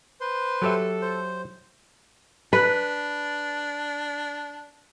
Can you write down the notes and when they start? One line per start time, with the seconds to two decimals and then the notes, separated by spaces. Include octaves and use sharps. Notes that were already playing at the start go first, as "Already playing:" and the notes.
0.21 B4 C5 C6
0.62 F#3 G4 A4 E5
1.02 C5
2.53 D4 B4